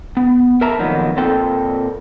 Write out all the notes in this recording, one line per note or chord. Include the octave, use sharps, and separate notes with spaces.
B3
A#4 B4 E5 A5 A#5
F2 A#2 D#3 F#3 B3
A#2 C4 A4 G5